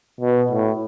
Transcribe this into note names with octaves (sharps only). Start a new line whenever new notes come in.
B2
A2